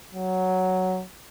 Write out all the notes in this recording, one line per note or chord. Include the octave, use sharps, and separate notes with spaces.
F#3